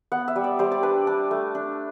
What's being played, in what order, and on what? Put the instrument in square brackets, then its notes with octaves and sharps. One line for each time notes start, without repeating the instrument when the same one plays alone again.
[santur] B3 F#5
E5
G3
D5
G3 C5
D5
D4 B4
D4
A3
D4